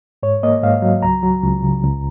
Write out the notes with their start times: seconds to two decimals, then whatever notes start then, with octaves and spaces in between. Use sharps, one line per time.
0.23 G#2 C#5
0.43 A#3 D#5
0.63 G#2 F5
0.82 F#3
1.02 C#2 A#5
1.23 F#3
1.43 C#2
1.63 C#3
1.84 C#2